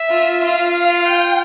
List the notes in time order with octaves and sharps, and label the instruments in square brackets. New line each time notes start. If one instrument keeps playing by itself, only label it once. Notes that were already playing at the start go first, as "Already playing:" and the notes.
Already playing: [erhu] E5
[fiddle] F4
[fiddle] F4 [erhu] F5
[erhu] G5